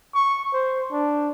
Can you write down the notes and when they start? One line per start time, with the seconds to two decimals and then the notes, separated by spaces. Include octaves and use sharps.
0.14 C#6
0.53 C5
0.92 D4